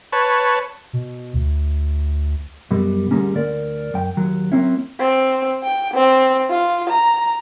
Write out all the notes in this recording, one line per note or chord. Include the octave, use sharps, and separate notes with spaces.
B4 C#5 A5
B2
D2
F#2 B2 G3
D2 G#2 G3 A#3 C#4
D2 A#4 D5
F#2 G5
D#2 F#3
F#3 A#3 C4 C#4 E4
C4
G5
C4
F4
A#5